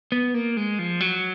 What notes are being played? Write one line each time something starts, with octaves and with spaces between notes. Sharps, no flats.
B3
A#3
G#3
F3
F#3